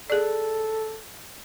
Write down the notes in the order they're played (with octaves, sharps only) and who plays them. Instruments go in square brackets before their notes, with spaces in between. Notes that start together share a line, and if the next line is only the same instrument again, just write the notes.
[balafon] G#4 D5 [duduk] A4